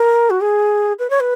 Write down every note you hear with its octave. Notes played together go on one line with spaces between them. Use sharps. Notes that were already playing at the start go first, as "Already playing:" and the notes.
Already playing: A#4
F#4
G#4
B4
C#5
B4